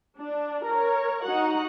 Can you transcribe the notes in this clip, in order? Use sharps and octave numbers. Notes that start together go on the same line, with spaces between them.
D4
A#4 C#5
D#4 F#4 F#5